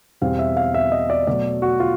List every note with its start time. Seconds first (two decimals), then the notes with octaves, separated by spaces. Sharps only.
0.21 E2 B2 G3 C4 F5
0.39 E5
0.57 F5
0.74 E5
0.92 D#5
1.10 D5
1.27 B2 F#3 A3 D5
1.62 F#4
1.80 F4